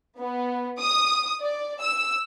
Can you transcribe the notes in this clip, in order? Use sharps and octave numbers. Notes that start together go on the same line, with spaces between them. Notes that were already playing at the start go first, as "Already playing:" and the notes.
B3
D#6
D5
E6